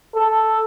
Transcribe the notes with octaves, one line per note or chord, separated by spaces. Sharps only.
A4